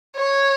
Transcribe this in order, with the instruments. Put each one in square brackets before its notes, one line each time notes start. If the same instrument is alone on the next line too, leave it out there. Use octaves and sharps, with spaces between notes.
[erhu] C#5